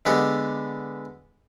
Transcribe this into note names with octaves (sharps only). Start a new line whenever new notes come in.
D3 G#3 B3 G4 A4